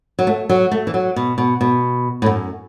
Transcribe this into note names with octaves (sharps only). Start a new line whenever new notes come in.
F#3
A3
F#3
A3
E3
F#3
B2
B2
B2
A2
F#2